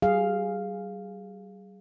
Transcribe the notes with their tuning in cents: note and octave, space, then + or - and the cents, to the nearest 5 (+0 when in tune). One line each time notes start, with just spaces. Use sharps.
G3 -40 G#4 +0 F5 +0